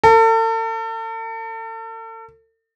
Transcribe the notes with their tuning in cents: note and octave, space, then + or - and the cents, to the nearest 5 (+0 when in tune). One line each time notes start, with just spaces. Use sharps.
A4 +40